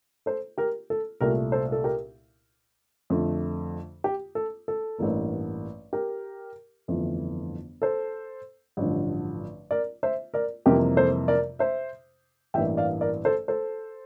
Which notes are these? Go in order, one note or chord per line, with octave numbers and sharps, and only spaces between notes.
A4 C5
G4 A#4
A4
C2 A#2 A3 G4 A#4
A4 C5
A4
G4 A#4
F2 D3 A3
G4
A4
A4
A1 G2 E3 A#3
G4 A#4
G1 F2 E3 A3
A4 C5
A1 G2 D3 F3
A#4 D5
C5 E5
A#4 D5
F2 C3 E3 G3 A#3 G4 A#4
A4 C5
A#4 D5
C5 E5
A1 G2 E3 A#3 E5 G5
D5 F5
A#4 D5
A4 C5
A4 C5